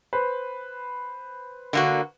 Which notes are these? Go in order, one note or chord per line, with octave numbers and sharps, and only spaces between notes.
B4 C5
D3 A#3 F#4